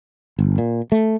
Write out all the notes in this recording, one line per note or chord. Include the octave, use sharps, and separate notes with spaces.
G1
A#2
A3